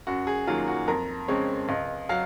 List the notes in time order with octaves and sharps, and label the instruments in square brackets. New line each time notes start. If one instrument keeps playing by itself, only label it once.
[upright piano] F#2 F#4
G#4
D#3 F#3 A#3 F4
F#4
F2 A#4
C#3 G#3 C4 C#5
C#2 D#5
F#3 F5